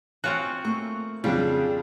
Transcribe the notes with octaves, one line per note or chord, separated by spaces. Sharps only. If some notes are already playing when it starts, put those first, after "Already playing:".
C4 F4 F#4 C#5 G#5 F#6
A3 A#3 C#6
F2 C#3 G3 C4 D4 F4 G#4